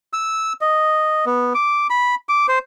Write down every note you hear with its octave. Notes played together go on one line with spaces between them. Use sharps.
E6
D#5
B3
D6
B5
D6
C5